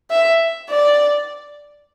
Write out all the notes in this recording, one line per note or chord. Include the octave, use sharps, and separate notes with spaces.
E5
D5